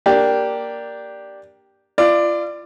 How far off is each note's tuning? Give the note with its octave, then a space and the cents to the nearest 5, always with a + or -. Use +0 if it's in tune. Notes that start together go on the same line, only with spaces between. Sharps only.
A#3 +0 D4 +0 G4 +0
F4 -35 D5 +15